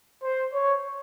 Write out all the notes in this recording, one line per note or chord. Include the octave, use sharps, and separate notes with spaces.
C5
C#5